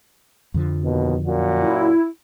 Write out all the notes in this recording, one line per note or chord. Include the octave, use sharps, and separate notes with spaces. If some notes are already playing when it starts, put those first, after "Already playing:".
F2 D3 F3
D#2 B2
F#2 A#2 F#4
E4